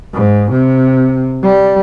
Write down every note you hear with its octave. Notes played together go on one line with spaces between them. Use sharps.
G#2
C3
G3